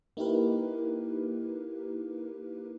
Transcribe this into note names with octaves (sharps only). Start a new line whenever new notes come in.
A#3 D#4 E4 G4 A#4 B4